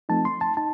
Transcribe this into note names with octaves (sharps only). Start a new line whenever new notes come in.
F3 A3 C4 D#4 A5
C6
A5
D#4 A5